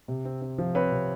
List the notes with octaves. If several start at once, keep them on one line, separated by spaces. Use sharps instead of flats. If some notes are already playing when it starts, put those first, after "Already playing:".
C3
C4
C4
F3
C4 B4 C#5
C3